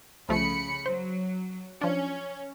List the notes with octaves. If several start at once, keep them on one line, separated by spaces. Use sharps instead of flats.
C2 C#3 F3 A3 B5 C#7
F#3 C5
F3 C#4 D4